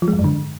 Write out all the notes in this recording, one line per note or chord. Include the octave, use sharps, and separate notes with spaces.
F3
G#3
G#2
F#2
D3